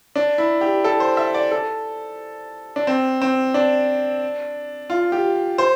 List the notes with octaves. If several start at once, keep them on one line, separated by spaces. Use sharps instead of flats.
D4
E4
G4
A4
C5
E5
D5
A4
D4
C4
C4
D4
F4
G4
C5